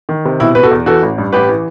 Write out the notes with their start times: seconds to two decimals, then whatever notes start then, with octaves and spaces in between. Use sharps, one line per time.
0.09 D#3
0.25 C3
0.40 B2 E4
0.55 B2 B4
0.63 F#4 A4
0.71 E2
0.86 E3 F#4 A4
1.02 A1
1.18 G2
1.32 A1 G4 B4
1.49 E3